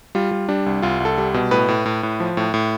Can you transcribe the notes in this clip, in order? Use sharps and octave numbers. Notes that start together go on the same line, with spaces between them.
G3 F4
G3
G3 D4
C2
C2 F4
C2 A4
G3
B2
A2 B4
A2
A2
A2
F3
A2
A2